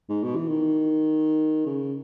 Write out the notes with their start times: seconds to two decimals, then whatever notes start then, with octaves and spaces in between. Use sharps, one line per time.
0.09 G#2
0.23 B2
0.35 E3
0.48 D#3
1.66 C#3